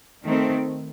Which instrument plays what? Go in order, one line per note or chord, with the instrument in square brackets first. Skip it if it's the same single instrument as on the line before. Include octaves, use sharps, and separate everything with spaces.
[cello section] D#3 A3 C4